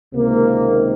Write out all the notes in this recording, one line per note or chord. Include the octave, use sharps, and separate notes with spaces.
C#2 C3 D#3 A#3